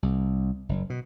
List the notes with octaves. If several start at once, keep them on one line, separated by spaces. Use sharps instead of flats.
C2
F#1
B2